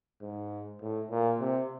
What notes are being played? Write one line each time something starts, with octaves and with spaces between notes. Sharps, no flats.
G#2
A2
A#2
C3